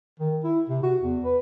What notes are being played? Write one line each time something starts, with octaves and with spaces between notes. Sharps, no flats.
D#3
E4
C3
F#4
E2
B4